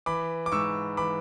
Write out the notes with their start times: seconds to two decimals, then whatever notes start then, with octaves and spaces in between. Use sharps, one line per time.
0.06 E3 B5 D6
0.46 D6
0.51 G#2 C#6 E6
0.97 E3 B5 D6